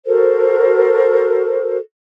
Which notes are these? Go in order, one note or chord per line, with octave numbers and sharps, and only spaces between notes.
F#4 A4 A#4 C5